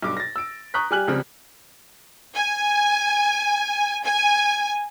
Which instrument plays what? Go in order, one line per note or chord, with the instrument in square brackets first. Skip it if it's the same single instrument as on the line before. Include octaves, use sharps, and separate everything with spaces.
[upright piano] B1 G2 D6
A6 A#6
E6 D7
A#5 C#6 D#6 F#6 G6 B6
G3 G4 G#5 F6 F#6 F#7
C#2 C#3 F3 G3 C4
[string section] G#5
G#5